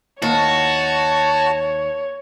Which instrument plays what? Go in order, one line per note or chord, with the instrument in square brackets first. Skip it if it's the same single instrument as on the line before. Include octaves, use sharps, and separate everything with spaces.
[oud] D#2 [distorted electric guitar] F#4 [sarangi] C#5 [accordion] A5